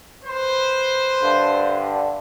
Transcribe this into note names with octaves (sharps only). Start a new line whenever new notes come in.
B4 C5
G2 D3